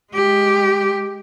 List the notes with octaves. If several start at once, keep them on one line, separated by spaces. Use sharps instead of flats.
G#3 G4